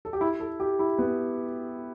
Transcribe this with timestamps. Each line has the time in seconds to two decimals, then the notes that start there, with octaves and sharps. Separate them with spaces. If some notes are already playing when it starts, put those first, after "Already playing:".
0.05 A4
0.13 G4
0.21 E4
0.40 A4
0.60 G4
0.79 E4
0.98 B3